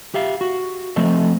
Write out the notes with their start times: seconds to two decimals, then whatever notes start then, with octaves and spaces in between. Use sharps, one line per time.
0.14 G4 E5 F5
0.41 F#4
0.96 F3 A3 C4 A4 D#5